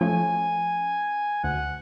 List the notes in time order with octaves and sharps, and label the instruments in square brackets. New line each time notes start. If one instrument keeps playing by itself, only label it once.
[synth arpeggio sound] F3 A3 C#4 [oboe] G#5
[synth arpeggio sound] D2 [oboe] F#5